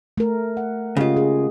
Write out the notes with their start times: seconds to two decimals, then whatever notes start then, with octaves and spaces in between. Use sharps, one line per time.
0.18 A3 A#4
0.57 F#5
0.97 C#3 G#3 F4 G4 D#5
1.17 G#4